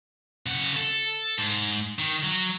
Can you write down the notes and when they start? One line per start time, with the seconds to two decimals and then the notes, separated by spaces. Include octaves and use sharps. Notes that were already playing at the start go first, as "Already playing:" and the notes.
0.46 C#3 F#5
0.76 A4
1.38 G#2
1.99 D#3
2.23 F#3